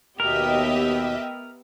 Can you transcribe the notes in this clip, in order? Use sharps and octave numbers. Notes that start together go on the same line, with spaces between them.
D#2 B2 B3 G4 A#4 D#5 E5